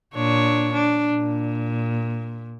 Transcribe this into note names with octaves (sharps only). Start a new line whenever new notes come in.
A#2 D4 C#5
D4
A#2